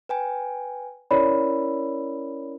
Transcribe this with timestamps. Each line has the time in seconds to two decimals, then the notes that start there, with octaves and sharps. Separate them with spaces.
0.09 B4 G5 G#5
1.11 C#4 E4 A#4 C#5 D5 B5